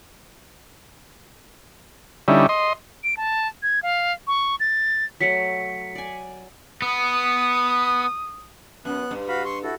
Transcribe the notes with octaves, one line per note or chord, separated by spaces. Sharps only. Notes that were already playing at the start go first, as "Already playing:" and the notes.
D3 G3 C#4 D#4 E4
D#5 C6
D7
A5
G#6
F5
C#6
A6
F#3 A3 B6 C#7
D5 G#5
B3 D#6
F#2 B3 F#6
G2
F#4 F5 B5
C6 C#6
E4 F#4 A4